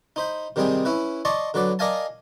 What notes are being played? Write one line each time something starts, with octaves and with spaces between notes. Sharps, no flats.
D#4 C5 B5
C3 D#3 G3 C4 G#4
C#4 E4 B4
D5 D#5 A5 C6 C#6
D3 F#3 B4 D5
A#4 D5 D#5 F5 G#5 A5